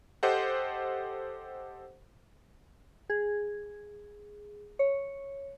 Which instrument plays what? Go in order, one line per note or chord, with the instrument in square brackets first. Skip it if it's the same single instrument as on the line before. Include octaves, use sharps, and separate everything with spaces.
[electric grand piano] G4 A4 C5 D#5 F#5
[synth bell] G#4
C#5